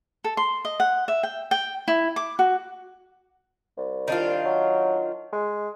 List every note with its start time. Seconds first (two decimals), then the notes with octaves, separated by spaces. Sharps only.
0.24 A4
0.37 C6
0.65 D#5
0.80 F#5
1.08 E5
1.23 G5
1.51 G5
1.88 E4
2.16 D6
2.39 F#4
3.78 C2
4.08 D#3 D4 F4
4.45 F#3
5.33 G#3